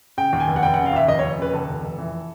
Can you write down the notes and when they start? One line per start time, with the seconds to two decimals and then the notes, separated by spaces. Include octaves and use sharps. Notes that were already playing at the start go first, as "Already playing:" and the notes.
0.17 C#3 G5
0.33 D#2
0.40 G#5
0.47 F1
0.56 F#5
0.63 F1 G5
0.74 C#3 F#5
0.86 F5
0.93 D#2 E5
1.08 F1 D#5
1.19 F1 C#5
1.38 C#3 B4
1.53 D#2 A4
1.69 F1
1.83 F1
1.98 E3